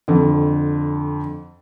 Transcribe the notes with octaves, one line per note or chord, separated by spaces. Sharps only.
F2 D3